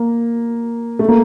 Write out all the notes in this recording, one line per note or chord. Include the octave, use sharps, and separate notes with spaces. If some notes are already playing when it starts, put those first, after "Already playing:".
Already playing: A#3
A3
A#3